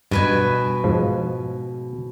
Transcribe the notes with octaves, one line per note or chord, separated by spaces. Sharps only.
G2 B2 B4 G#5
G#2 F3